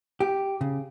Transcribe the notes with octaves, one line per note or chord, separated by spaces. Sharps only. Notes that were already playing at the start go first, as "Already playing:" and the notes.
G4
C#3